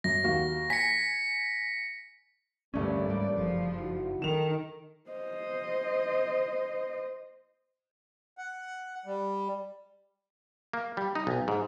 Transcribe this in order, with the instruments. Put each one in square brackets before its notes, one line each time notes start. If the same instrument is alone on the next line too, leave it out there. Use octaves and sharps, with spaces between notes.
[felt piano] F#2 [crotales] A#6
[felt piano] D#2 F#4 F5
[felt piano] G#5 [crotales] B6 C#7
[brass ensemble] A1 A#3 D5 [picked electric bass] D2 C#4 [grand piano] G2 A3 D4
[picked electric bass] G#2 G3
[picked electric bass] F#1 [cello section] F3
[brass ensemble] D#4 E4 F#4
[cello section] D#3 [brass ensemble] D4 A4 A#4 [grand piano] E7 F7
[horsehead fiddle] C5 D#5
[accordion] F#5
G3
[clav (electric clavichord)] A#3
G3
D#4
B1
G#2